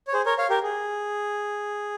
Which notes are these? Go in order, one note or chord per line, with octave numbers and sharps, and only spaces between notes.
C#5
G#4 C5
A#4 C#5
C#5 F5
G4 A#4
G#4